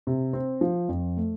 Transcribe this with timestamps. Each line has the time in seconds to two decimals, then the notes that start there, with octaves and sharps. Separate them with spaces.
0.07 C3
0.33 C4
0.61 F3
0.88 F2
1.17 A3